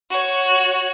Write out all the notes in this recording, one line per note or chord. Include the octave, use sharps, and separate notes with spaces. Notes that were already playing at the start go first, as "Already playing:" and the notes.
F#4 C#5